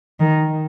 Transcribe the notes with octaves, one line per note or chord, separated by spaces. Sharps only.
D#3